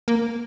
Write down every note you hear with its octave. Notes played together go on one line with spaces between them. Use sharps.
A#3